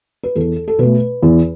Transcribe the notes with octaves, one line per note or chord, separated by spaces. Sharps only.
B4
E2 A4
A4
B2 A3 B4
E2